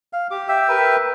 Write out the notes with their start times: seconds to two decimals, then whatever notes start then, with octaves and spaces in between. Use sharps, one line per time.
0.13 F5
0.31 G4 D6
0.48 E5 G5 E6
0.69 A#4 B4